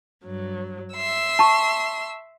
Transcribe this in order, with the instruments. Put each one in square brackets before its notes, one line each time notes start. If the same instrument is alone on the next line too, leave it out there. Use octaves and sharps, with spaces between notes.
[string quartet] G2 F#3
E5 C6 E6
[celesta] A5 C#6